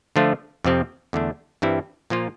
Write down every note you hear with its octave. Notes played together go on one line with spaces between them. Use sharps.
D3 F3 A3 D4 F4
F2 C3 F3 C4 G4
E2 D3 A3 D4
G2 E3 G3 C4 E4
A#2 F3 A#3 F4